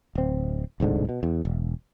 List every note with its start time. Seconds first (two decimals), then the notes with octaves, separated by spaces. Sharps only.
0.15 D1 C4
0.80 D1 C2 G#2 D3
1.09 B2
1.23 E2
1.45 E1